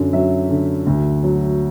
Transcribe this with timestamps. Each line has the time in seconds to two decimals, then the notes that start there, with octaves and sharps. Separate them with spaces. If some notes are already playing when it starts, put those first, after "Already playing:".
Already playing: F#2 D3
0.13 F#3 E5
0.50 D3
0.86 D2
1.23 F#3